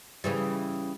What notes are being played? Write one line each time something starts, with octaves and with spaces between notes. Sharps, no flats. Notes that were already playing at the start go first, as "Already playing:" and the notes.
C#3 E3 G3